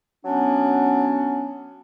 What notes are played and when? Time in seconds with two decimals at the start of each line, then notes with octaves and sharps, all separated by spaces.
0.25 F#3 B3 C#4 D4